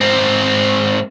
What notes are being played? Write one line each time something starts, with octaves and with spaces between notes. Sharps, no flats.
G#2 C4